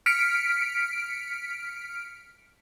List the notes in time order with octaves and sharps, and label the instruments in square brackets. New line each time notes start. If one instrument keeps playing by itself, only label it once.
[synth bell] F6 B6 C#7 D7